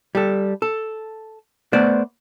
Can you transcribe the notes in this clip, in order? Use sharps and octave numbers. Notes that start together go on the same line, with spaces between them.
G3 A4
A4
A3 B3 C5 D5